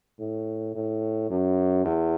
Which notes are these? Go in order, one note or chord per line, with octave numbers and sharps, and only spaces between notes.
A2
A2
F#2
E2